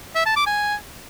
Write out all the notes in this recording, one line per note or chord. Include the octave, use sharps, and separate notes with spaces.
E5
A5
D6
G#5